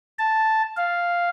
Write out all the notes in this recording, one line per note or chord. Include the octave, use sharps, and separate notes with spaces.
A5
F5